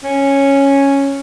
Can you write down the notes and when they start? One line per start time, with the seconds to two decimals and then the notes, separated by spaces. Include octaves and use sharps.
0.04 C#4